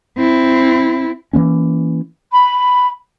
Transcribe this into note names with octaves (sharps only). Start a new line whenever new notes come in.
C4 E4
E3 F#3 A#3 C#4
B5